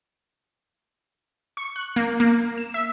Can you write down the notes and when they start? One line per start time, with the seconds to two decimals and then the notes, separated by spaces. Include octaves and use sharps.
1.57 C#6
1.76 F#6
1.96 A#3
2.20 A#3
2.58 E7
2.74 E5